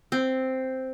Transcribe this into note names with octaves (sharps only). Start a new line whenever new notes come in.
C4